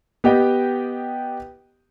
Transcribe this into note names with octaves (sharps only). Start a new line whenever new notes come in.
B3 G4 D#5 G5